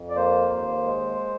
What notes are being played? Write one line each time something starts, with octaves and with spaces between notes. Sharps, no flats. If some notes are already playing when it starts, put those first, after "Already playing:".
Already playing: F2
D5
A#3 C5
D#2
G#3